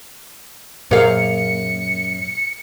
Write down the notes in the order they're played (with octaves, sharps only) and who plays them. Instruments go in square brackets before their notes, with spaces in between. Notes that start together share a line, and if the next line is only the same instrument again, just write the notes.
[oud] F#2 F5 [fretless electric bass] A#2 [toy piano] G#4 A#4 C5 [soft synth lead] C#7